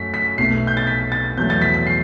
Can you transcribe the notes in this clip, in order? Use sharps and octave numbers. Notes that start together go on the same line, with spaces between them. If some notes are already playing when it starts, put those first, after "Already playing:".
Already playing: F#2 F#3 A3 B6
B6
B1 B2 A3 C7
G6
A6
B6
A6
E2 B2 F#3 A3 G6
A6
B6
B6
C7